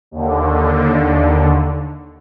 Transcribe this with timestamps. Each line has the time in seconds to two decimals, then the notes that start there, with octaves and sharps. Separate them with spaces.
0.11 D#2 D3